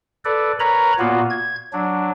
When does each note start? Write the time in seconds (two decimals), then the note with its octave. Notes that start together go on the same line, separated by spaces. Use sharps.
0.25 A4 B4 D5
0.60 A#4 B4 C#5 A#5 B5
0.99 A#2 A#3 B3 F4 F#4
1.30 G#6
1.73 F#3 D4